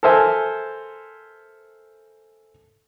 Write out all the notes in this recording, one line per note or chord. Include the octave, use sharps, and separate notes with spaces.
A4 A#4 C5 E5 G#5